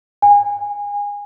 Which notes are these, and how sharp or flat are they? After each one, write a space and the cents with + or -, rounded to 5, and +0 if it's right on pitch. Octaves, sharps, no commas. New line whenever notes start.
G#5 -25